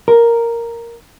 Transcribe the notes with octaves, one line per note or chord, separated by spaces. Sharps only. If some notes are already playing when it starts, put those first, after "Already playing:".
A#4